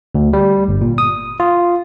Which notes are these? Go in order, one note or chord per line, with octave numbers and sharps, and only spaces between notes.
D2
G3
G1
A#2
D#6
F4